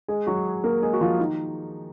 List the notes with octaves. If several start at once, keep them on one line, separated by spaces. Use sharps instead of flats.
G#3 G#4
F#3 F#4
A#3 A#4
G#3 G#4
F#4
F3 F4
D#3 D#4